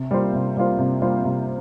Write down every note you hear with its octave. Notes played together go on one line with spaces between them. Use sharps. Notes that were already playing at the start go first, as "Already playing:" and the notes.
Already playing: C3
G3 A#3 F4 C5
C3
G3 A#3 F4 C5
C3
G3 A#3 F4 C5
C3